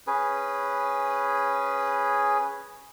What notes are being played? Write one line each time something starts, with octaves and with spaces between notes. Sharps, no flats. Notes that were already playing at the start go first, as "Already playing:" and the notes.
C#4 G#4 B4